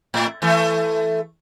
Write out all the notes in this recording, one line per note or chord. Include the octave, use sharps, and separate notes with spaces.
A2
E3 A3